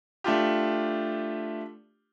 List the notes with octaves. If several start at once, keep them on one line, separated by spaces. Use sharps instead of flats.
A3 D4 F4 G4